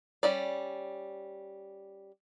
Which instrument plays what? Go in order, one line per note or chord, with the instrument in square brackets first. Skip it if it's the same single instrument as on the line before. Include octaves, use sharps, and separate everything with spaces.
[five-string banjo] G3 C#4 D5